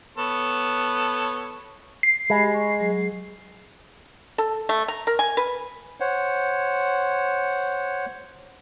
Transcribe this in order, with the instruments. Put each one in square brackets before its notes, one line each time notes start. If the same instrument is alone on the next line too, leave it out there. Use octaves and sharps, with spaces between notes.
[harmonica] B3 A4 C#5
[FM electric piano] C7
[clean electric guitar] G#3 [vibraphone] G4 B5
[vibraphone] C#6
F#3 G#4
[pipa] A4
A3
A#5
A#4
G#5
B4
[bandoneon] C5 C#5 F#5